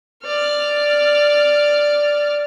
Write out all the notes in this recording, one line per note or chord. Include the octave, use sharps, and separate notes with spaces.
D5 F6